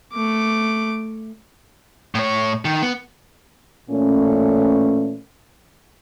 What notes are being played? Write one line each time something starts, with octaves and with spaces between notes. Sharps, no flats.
A3 D6
A2 C#5
D#3
B3
A#2 E3 A3 C#4